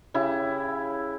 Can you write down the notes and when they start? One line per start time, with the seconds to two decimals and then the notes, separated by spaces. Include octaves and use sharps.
0.14 C#3 E4 G4